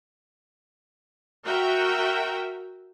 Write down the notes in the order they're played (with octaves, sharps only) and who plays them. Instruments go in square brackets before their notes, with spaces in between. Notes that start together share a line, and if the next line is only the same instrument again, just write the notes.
[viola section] F#4 A#4 E5 G5